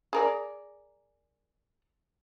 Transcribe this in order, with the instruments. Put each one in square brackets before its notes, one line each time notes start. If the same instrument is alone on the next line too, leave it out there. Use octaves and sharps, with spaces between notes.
[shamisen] G#4 A#4 D5